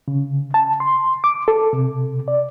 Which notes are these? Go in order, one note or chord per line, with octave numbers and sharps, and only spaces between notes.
C#3
A5
C6
D6
A4
C3
D5